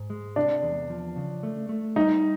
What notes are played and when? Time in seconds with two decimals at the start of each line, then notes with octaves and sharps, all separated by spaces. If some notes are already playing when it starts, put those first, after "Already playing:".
Already playing: G#2
0.10 G#3
0.36 C3 D4
0.63 E2
0.90 F3
1.16 C#3
1.43 A3
1.69 A3
1.96 G3 D#4